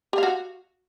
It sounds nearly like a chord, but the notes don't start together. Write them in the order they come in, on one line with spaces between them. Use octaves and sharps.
G4 F5 F#4